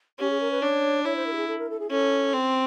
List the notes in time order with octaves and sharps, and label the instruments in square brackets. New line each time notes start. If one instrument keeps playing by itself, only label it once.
[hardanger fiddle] C#4 [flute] G4
[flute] G#4
A#4
B4
[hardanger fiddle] D4 [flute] C#5
[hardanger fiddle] E4 [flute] C#5
[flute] C5
A#4
G4
G#4
A4
A#4
A4
G#4
[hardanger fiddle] C#4 [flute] A4
[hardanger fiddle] C4